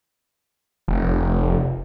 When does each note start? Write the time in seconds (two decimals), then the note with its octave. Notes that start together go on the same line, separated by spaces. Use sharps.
0.88 F1